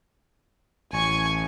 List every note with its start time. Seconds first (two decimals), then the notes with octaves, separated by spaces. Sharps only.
0.93 A1 G#5 C#6